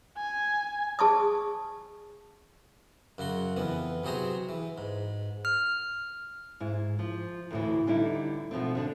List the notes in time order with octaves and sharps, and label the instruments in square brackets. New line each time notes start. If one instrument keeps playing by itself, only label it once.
[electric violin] G#5
[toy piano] G#4 A5 C#6 D#6
[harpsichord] F#2 C#3 F#4 C6
F2 E3 B3
C3 F#3 G#4 C5 A#5
E3
G#2
[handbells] F6
[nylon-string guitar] G#2 E4
F3
D2 A2 E3
D3 G3 D#4 E4
B2 F3 A3 C4
D3 D4